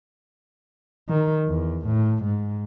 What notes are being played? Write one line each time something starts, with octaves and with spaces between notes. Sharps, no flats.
D#3
E2
A2
G#2